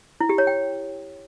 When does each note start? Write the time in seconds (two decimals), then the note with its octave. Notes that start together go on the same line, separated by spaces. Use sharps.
0.21 E4
0.29 G4
0.38 C#5
0.47 G5